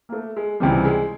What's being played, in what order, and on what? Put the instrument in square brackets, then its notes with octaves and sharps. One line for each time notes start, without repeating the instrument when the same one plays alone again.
[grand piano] A#3
A3
G#3
C#2 C3 E3 G3
G#3